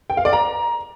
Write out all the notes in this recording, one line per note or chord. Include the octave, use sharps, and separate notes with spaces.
G5
F5
D5
A#5